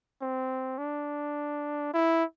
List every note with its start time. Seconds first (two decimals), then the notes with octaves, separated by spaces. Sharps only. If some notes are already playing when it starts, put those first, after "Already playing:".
0.21 C4
0.78 D4
1.94 E4